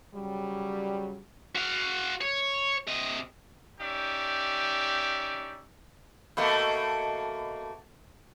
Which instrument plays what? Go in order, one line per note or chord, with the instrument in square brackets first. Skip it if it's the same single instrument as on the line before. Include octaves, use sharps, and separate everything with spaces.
[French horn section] C#3 F#3 G3
[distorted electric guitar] F#4 F5
C#5
C3 D#5
[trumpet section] C#4 D#4 G4 D5 E5
[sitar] B2 A3 A#3